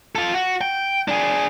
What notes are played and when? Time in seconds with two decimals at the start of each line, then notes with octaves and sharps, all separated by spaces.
0.15 F4 A4
0.34 F#4
0.61 G5
1.08 D4 G#4